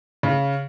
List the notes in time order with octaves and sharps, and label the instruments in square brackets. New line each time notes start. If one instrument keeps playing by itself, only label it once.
[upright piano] C#3